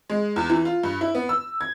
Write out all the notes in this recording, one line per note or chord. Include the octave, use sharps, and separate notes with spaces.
G#3
E2
E3
F4
G2
E4
B3
E6
G#6